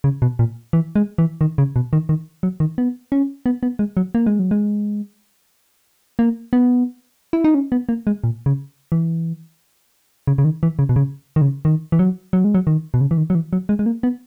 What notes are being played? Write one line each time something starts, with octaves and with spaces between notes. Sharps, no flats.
C#3
B2
A#2
E3
G#3
E3
D#3
C#3
B2
D#3
D#3
F#3
D#3
B3
C#4
B3
B3
G#3
F#3
A#3
G#3
F#3
G#3
A#3
B3
E4
D#4
C#4
B3
A#3
G#3
A#2
C#3
E3
C#3
C#3
D#3
E3
C#3
B2
C#3
D#3
C#3
D#3
E3
F#3
F#3
G#3
F#3
D#3
B2
C#3
E3
D#3
F#3
E3
F#3
G#3
G#3
A#3
B3